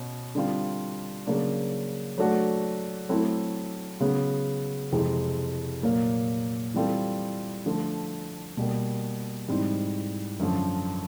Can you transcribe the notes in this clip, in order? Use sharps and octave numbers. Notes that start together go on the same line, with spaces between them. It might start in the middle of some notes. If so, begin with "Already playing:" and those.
Already playing: B2 C#4
D3 G3 C4 F4
C#3 F#3 A#3 D4
F#3 A3 D4 F#4 A4
F#3 A3 C4 E4
C#3 F#3 B3
F2 C3 E3 G#3
A#2 F#3 A#3
E3 G3 C4 F4 A4
D3 F3 A3
B2 G3 A#3
G#2 E3 G3 C4
F#2 D3 F3